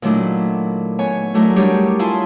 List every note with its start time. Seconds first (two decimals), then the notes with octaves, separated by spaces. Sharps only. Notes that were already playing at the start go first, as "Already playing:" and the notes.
0.02 A#2 D#3 F#3 A3 D4 E4
0.99 B3 C#5 G#5
1.34 F#3 A3 D4 E4 A#4
1.56 G3 D4 G4 G#4 A#4 C#5
1.99 E4 F4 G#4 G#5 A5 C6